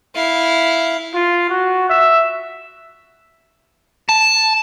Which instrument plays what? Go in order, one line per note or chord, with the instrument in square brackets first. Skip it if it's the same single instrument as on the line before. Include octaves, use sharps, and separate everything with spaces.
[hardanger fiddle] E4 F5
[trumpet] F4
F#4
E5
[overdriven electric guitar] A5